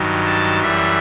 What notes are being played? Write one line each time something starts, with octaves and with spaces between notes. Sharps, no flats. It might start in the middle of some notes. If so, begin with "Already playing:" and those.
Already playing: G2 D#3 F#3
A5
F#2 E3 G3 E5